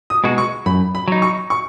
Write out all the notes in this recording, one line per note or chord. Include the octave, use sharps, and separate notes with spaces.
D#6
B2 G#3 D#4 F#4
C#6
F#2 B5
B5
F#3 D#4
C#6
C#6